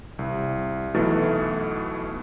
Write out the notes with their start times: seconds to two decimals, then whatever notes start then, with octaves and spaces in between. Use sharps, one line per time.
0.19 C2
0.94 B1 B2 E3 A3 A6